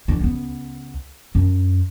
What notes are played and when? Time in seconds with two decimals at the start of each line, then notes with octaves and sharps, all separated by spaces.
0.08 D3 E3
0.20 C#2 B3
1.35 F#2